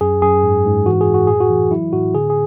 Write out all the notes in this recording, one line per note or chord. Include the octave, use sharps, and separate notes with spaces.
F#2 G#4
F#2 G#4
G#2
G#2
E3 F#4
G#4
F#2
F#4
A2 G#4
F#4
E3
F#3 E4
A2 F#4
D3 G#4
G#4